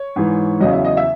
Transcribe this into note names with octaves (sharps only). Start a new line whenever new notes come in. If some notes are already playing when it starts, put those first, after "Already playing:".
Already playing: C#5
G#2 E3
E2 C#3 F#3 D#5
E5
D#5
E5